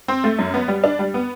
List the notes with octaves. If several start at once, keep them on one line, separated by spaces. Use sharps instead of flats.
C4
A3
F#2
B3
G3
D4
G3
B3